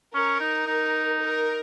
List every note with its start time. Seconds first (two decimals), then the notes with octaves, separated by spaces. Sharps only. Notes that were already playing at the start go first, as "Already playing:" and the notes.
0.15 C#4 A#4
0.40 D#4
0.67 D#4
1.20 A#4